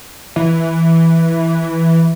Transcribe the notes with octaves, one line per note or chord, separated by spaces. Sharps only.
E3